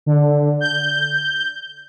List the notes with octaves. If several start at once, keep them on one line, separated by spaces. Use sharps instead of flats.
D3
G6